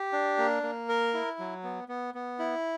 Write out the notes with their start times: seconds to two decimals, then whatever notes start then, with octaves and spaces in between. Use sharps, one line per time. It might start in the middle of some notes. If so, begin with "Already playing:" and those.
Already playing: G4
0.13 D4
0.38 A#3
0.63 A#3
0.89 A#4
1.14 E4
1.39 F#3
1.64 B3
1.88 B3
2.14 B3
2.39 E4